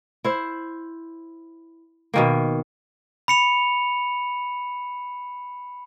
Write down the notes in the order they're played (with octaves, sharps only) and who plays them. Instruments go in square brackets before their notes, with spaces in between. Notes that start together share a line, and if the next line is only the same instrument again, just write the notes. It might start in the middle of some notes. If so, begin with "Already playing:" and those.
[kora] E4 C5
B2 D#3 A#3
[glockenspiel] B5 C#7 F7